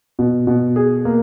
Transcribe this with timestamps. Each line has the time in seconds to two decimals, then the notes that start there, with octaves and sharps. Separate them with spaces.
0.19 B2
0.47 B2
0.76 G#4
1.05 A#3